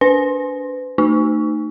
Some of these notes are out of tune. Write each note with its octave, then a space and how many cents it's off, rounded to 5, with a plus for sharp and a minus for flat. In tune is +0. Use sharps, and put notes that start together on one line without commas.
D4 -30 B4 +40
A3 +35 D#4 -25